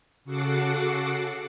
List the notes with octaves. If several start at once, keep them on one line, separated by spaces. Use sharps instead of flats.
C#3 F#4 A4 F#5 D6 C7